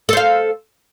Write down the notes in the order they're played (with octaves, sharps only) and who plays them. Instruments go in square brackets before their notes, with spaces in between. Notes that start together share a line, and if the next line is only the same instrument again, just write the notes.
[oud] A4
C5
F5